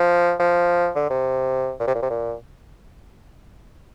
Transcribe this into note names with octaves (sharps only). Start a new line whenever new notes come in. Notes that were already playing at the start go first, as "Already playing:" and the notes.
Already playing: F3
F3
D3
C3
A#2
C3
A#2
C3
A#2